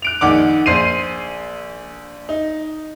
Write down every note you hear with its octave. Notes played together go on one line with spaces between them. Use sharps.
F#6 D7 F7
A#1 D#3 F#5 D6
A#1 C5 C7 D#7
D#4